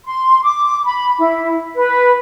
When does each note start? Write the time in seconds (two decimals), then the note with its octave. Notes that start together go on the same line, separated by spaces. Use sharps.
0.06 C6
0.43 D6
0.85 B5
1.20 E4
1.75 B4